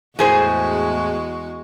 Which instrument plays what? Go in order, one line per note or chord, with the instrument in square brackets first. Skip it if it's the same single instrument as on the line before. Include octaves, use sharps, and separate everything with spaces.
[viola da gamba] E2 G#3 F#4 [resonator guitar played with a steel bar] A2 G#4 C5